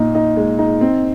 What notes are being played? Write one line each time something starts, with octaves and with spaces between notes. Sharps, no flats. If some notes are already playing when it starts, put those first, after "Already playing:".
Already playing: A#2 D#4
D#4
G#3
D#4
C4